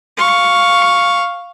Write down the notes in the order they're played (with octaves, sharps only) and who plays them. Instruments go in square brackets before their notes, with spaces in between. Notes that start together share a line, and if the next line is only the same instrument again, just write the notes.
[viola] F5 C#6